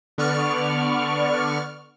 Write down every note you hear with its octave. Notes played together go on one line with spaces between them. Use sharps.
D3 B3 D5 C#6 F6